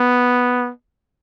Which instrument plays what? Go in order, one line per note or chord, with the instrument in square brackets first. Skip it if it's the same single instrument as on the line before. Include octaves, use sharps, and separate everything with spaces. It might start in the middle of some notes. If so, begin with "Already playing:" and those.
Already playing: [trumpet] B3